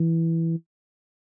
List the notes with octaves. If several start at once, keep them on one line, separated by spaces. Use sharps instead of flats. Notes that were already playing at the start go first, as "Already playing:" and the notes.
Already playing: E3